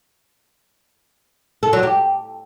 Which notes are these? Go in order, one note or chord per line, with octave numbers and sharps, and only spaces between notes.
A4
F#3
G4